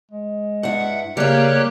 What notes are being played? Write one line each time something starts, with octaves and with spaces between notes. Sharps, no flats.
G#3
G2 E4 F#5
C#3 G3 A#3 G4 C#5 D5 F#6